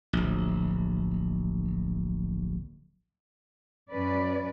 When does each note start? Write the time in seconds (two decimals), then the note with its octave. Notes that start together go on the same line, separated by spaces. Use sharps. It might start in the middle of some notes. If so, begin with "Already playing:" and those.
0.13 D1 A#1
3.91 F#2 C#4 B4 D5